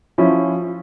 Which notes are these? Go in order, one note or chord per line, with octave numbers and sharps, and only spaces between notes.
F3 C#4 E4